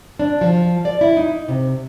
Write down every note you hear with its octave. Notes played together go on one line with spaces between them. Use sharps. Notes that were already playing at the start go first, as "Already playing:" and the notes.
D4
F3
D5
E4
D#4
C3